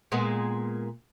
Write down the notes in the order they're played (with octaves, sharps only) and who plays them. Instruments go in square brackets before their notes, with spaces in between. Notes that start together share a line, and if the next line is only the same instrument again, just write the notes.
[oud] A#2 G#3 B3